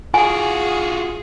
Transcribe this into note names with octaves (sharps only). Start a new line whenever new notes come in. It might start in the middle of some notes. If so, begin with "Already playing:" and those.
F4 F#4 G#4 G#5